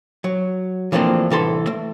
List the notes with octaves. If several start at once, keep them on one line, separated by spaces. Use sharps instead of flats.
F#3
E3 F3 A3 A#3 C4 D4
C2 E3 A4 C6
A3